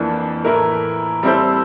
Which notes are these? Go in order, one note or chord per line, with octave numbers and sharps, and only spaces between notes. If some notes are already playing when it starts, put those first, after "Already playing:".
Already playing: F2 E3 A#3 D4 A4
A2 E3 A3 E4 A#4
G3 C4 E4 A4 C5